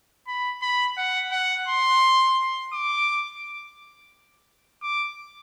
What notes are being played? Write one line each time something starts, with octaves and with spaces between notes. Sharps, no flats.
B5
B5
F#5
F#5
C6
D6
D6